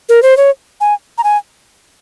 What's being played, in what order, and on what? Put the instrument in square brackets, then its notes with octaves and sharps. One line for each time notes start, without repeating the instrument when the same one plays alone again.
[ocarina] A#4
C5
C#5
G#5
A#5
G#5